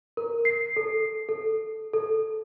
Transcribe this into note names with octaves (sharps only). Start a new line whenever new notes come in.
A#4
C7
A4
A4
A4